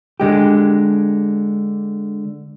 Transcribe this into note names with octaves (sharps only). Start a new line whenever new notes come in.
D3 G#3 G4